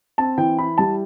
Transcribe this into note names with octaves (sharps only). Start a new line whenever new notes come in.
C4 A5
E3 G5
E4 B5
G3 A5